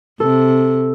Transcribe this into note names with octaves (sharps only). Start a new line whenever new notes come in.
C3 A4